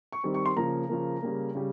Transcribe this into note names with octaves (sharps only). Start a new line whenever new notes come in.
C#6
D#3 G3 C4
C#6
C6
C#3 F3 A#3 A#5
C#3 F3 A#3
C#3 G3 A#3
C#3 G3